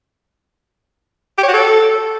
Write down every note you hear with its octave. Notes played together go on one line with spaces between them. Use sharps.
G4
C#5
F#4
A4